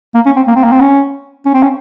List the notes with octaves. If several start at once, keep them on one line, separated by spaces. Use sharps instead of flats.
A#3
C#4
C4
A#3
C4
A#3
C4
C#4
C#4
C4
C#4